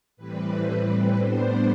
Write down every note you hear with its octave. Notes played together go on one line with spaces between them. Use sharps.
A2 E3 G3 C4 B4
B4
A2 G3 B3 D4 C5